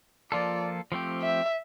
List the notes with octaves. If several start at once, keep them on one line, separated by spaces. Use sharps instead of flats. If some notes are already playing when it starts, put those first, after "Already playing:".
F3 A#3 F4 A4 D5
F3 A3 C4 G4
E5